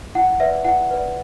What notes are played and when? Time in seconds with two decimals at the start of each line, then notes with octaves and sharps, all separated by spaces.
0.15 E4 F#5
0.40 B4 D5 E5
0.64 E4 F#5
0.91 B4 D5